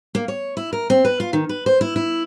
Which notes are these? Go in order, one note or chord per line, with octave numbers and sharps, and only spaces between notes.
A#3
C#5
E4
A#4
C4
B4
F4
D#3
B4
C5
E4
E4